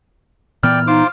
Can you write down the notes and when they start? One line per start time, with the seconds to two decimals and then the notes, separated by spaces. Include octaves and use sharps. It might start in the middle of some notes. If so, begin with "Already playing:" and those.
0.63 A#2 E3 B3 D5 G5 F6
0.87 D#4 F4 C5 D6